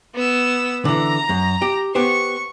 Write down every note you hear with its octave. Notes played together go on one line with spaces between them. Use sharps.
B3 E6
D3 E3 A#5
F#2
G4
B3 G4 C5 C#6